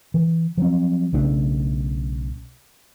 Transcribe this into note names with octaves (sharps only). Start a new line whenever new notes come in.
E3
F3 F#3 C4
B1 C#3 A3 D4